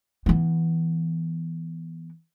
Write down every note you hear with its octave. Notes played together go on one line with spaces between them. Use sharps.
E3 B3